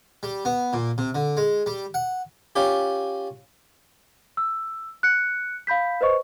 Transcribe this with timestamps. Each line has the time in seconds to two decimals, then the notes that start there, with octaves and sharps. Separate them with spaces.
0.23 G3
0.45 B3
0.73 A#2
0.98 C3
1.15 D3
1.37 G#3
1.66 G3
1.94 F#5
2.56 C#4 F4 G4
4.37 E6
5.03 F#6 C#7
5.67 F5 B5 G6 B6
6.01 B4 C5 D#5 C#6